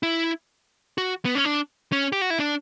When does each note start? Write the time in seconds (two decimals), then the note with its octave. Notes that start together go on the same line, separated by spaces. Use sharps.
0.03 E4
0.98 F#4
1.25 B3
1.35 C#4
1.45 D4
1.92 C#4
2.12 G4
2.21 F#4
2.30 E4
2.39 D4